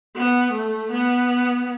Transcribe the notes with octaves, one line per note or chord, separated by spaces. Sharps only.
B3
A3
B3